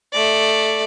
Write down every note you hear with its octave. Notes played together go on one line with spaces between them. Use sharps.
A3 D5